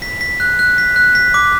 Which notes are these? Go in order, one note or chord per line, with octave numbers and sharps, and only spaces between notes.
B6
B6
F#6
F#6
B6
F#6
B6
D6